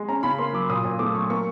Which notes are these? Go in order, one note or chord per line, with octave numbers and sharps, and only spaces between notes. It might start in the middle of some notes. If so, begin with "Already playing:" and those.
Already playing: G#3
C#4 A#5
C#3 B5
A#3 C6
F#3 D6
A#2 D#6
A#2
A3 D6
F#3 C#6
A#3 C#6